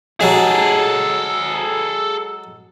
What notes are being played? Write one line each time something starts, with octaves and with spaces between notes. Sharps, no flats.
F#3 G#3 G#4 A4